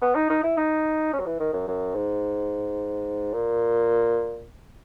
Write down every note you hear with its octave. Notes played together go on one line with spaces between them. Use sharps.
B3
D#4
D#4
E4
D#4
C#4
F#3
E3
D#3
F#2
F#2
G#2
A#2